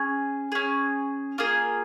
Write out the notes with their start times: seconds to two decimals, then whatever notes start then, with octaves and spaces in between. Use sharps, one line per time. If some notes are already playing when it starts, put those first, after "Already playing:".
Already playing: C#4 G#4
0.52 C#4 G#4
1.38 A#3 F4 G#4